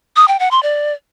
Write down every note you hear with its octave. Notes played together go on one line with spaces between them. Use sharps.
D#6
G5
F#5
C6
D5